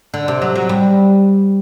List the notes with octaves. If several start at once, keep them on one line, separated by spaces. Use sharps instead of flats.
D3
C3
F#3
F#3
G3